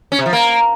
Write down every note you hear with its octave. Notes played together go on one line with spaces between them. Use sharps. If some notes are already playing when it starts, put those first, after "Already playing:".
C#4
C3
F3
A#3